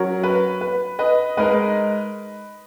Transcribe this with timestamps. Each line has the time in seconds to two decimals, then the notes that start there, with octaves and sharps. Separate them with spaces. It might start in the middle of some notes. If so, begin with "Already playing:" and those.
Already playing: F#3 C#4 F#4 A#4
0.23 B4
0.61 B4
0.99 B4 D#5
1.37 G#3 D#4 A#4 B4 D#5